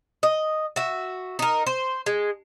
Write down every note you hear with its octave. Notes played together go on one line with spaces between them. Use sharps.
D#5
F#4 E5
D#4 A#4
C5
G#3